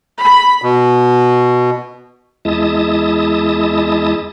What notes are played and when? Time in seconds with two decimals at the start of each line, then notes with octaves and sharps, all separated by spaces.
0.20 B5
0.62 B2
2.45 E2 G#3 E4 A5 D#6